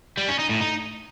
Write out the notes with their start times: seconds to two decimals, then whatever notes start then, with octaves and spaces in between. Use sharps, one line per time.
0.17 G3
0.28 C#4
0.39 D#4
0.49 A2
0.60 D#4